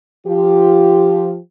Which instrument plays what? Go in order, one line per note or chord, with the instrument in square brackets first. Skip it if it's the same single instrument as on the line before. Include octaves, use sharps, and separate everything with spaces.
[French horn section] F3 F4 G4